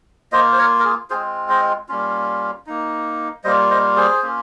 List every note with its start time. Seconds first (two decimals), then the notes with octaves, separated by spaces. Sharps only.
0.32 A#3 F4 C5 D#5
0.52 C5
0.58 A#4 C#5
0.80 A#4
0.84 G#4
1.10 G#3 C4 F4 G#4 C5
1.49 C5 D#5
1.89 G3 A#3 C#4 F4
2.67 A#3 D#4
3.44 G3 A#3 F4 C5 D#5
3.70 C5 D#5
3.96 G#4 C5
4.22 A#3 C#4 F4